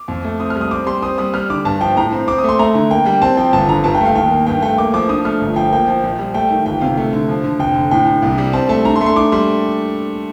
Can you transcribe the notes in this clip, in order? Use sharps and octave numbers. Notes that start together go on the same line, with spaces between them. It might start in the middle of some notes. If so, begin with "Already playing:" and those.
Already playing: D6
F2
A3
C4 D#6
F6
G3
D#6
C4 D6
G3 C6
C4 D#6
G3 D#6
G3 F6
D3 D6
G2 A5
F3 G5
A2 A#5
C4
C4 D6
D#6
A3 C6
A3 A#5
D3
A#3 G5
G3 G5
C4 A5
F3 G5
G1 A5
D3 A#5
G2 A5
G5
A3 F5
D#2 G5
A#3
G2 G5
A3 G5
A#3 D6
F3 D6
D4 D#6
A3 F6
G1
F3 G5
A#3 G5
F3
A#1
G3
A3 G5
D#3
G1 G5
C3 F5
A3
D3
F3
D3
F1 G5
D3
A2 G5
D4
C2
G3
C4 A5
A3 A5
D4 A#5
C6
A3
C6
D4 D6
G3 C6